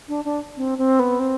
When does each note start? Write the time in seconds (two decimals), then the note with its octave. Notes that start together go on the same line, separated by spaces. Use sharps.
0.08 D4
0.25 D4
0.57 C4
0.78 C4
1.00 B3
1.19 C4